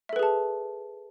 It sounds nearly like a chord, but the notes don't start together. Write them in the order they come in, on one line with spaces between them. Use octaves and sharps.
E5 A4 B4 G#4 A5